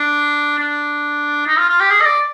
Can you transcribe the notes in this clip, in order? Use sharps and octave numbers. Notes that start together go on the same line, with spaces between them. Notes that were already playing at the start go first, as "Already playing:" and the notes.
Already playing: D4
D4
D#4
F4
F4
G4
G#4
D#5
D5